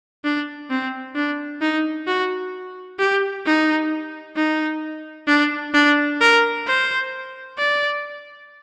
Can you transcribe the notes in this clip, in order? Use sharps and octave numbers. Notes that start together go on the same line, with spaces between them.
D4
C4
D4
D#4
F#4
G4
D#4
D#4
D4
D4
A#4
C5
D5